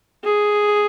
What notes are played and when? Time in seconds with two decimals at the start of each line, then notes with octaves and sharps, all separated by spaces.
0.24 G#4